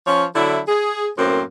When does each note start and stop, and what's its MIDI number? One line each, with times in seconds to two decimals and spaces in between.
0.07 0.24 53
0.07 0.24 61
0.07 0.24 73
0.36 0.59 50
0.36 0.59 54
0.36 0.59 64
0.68 1.07 68
1.18 1.42 42
1.18 1.42 45
1.18 1.42 58
1.18 1.42 60